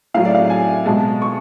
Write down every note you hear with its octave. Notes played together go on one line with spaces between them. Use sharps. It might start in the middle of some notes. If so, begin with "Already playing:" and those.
A2 F#3 F5
D5
F5
G#5
B2 G#3 A5
C#6